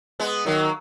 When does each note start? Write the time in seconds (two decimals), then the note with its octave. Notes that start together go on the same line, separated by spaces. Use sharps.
0.20 G#3 B3
0.46 D#3 F#3 A#3